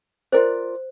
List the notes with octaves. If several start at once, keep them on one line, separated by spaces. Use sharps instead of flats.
F4 A#4 C5 D5